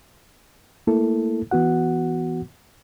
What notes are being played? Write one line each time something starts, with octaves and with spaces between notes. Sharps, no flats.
A3 A#3 E4 A4
E3 B3 F#4 F#5